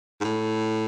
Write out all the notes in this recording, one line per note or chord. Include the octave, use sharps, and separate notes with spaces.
G#2
A2